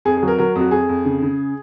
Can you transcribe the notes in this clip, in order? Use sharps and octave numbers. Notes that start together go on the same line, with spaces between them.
F2 G#4
G#4
F#3
A#4
F#3 A#4
F2
F#4
F2 G#4
F2
C#3
C#3